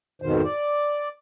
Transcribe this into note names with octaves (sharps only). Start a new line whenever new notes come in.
F2 G#2 B2 D#3 C5
D5